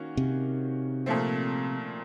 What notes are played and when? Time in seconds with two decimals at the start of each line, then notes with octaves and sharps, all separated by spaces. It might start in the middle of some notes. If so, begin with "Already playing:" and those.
Already playing: D#3 A#3 C#4 F#4
0.17 C3
1.06 A#2 F3 A3 C4